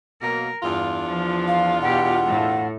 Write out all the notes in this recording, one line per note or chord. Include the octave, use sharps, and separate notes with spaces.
B2 F#3 A#3 A#4
E2 G2 D4 F4
F3
F5
B2 G4 F#5
A2 A3